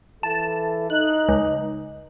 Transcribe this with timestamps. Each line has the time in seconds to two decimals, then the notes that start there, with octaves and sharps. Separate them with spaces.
0.23 E3 A4 A5
0.90 D#4 F#6
1.29 C#2